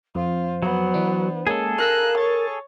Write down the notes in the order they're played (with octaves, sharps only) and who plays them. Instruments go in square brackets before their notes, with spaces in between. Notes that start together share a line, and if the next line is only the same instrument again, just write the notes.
[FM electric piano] F2 [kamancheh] F4 [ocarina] C5
[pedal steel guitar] F#3 [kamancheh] B3
[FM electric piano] E3 D4
[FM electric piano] G#3 A#3 C#4 [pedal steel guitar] G#4 A4
[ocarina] A#4 [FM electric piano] F5 A#5 E6 [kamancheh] F#6
[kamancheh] C#5 [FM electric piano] A6